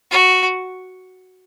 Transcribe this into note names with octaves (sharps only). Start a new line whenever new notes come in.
F#4